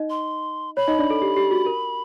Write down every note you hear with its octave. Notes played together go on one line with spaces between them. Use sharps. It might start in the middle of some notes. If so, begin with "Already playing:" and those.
Already playing: D#4 D#5
C6
C#5 B5
D#4 D#5
D4 D5
A4
G4
G4
F#4
A#4